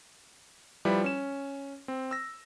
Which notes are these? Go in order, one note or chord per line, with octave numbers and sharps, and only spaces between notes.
F3 G3 E4 B4 D5
C#4 E7
C4
E6 A#6